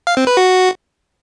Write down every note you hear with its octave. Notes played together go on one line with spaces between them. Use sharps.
F5
C4
B4
F#4